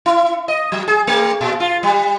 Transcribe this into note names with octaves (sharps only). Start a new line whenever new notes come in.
E4
D#5
F#3
G#4
A3
A#2
F4
G3